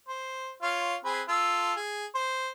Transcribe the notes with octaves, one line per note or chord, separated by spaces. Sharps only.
C5
F4 C#5 F5
C4 G#4 B4
F4 A4 E6
G#4
C5